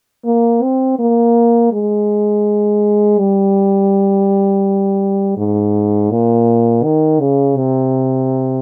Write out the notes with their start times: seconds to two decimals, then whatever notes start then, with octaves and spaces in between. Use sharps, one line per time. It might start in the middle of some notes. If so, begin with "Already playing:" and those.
0.25 A#3
0.63 C4
0.99 A#3
1.72 G#3
3.18 G3
5.37 G#2
6.11 A#2
6.84 D#3
7.20 C#3
7.57 C3